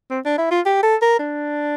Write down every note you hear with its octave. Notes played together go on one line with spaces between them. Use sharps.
C4
D4
E4
F4
G4
A4
A#4
D4